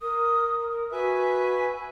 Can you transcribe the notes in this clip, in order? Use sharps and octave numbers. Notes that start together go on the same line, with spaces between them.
A#4 D#6
A#4
F#4 B4 E5 G#5